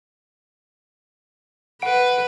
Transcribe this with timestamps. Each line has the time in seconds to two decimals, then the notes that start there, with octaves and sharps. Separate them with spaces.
1.82 B4 F#5 D7